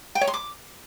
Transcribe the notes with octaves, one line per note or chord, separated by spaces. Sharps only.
G5
C#5
C6
D6